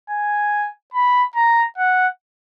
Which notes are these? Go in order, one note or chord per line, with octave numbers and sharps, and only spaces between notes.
G#5
B5
A#5
F#5